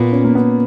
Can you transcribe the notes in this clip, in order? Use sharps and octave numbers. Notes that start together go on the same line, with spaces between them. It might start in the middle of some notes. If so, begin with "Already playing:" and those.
Already playing: A#2 B3
C#4
A#3
B3